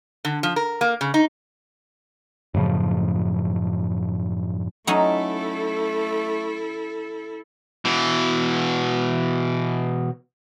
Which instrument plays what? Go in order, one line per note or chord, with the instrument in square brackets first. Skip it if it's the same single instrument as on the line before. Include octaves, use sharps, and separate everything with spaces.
[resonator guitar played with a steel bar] D3
F3
A#4
A#3
C#3
D#4
[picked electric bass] F#2 A2 C#3 F3
[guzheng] F#3 C#4 D#4 [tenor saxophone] A3 [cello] E4 A4
[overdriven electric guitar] B2 E3